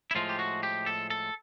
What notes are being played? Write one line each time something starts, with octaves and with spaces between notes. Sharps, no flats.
E4
A2 F3 G#3 F4
G4
F#4
G4
A4
A4